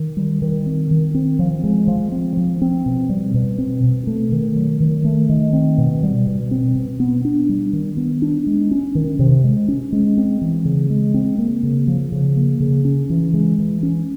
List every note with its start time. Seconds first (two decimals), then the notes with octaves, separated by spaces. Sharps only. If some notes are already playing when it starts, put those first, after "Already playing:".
Already playing: D#3
0.17 G3
0.42 D#3
0.66 C4
0.91 D#3
1.15 C4
1.39 F3
1.64 G#3
1.88 F3
2.12 C4
2.37 F3
2.62 C4
2.86 B2
3.09 G3
3.34 B2
3.58 C4
3.83 B2
4.07 A3
4.32 D#3
4.56 F#3
4.80 D#3
5.04 A3
5.29 D#3
5.53 C4
5.78 B2
6.03 G3
6.27 B2
6.51 C4
6.75 B2
7.00 B3
7.25 D4
7.49 G3
7.73 D#3
7.97 B3
8.22 D4
8.47 G#3
8.71 C#4
8.95 D#3
9.19 C3
9.44 G#3
9.68 C#4
9.92 G#3
10.18 C4
10.42 E3
10.65 C#3
10.90 G#3
11.14 C4
11.38 A#3
11.63 C#3
11.87 F3
12.12 C#3
12.36 A#3
12.60 C#3
12.85 C#4
13.10 E3
13.34 G#3
13.59 E3
13.83 C#4